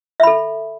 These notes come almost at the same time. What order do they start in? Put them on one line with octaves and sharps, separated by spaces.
E5 B5 A4